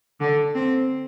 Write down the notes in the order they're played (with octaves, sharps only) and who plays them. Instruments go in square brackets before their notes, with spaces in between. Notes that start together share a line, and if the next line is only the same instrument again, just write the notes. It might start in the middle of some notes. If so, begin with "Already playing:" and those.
[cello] D3
C4